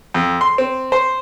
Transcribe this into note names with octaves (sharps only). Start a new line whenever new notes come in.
F2
C6
C4
C5